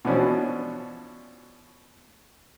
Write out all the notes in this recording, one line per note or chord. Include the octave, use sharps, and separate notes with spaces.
B2 E3 F3 C#4 D4 F#4